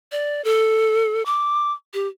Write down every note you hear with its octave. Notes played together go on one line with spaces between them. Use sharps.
D5
A4
D6
G4